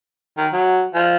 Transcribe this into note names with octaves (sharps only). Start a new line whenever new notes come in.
D#3
F#3
F3